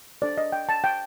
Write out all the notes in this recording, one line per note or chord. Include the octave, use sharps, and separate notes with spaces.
D4 A4 C5 D5
D#5
G5
A5
G5